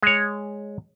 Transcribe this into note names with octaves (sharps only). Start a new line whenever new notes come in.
G#3 C#5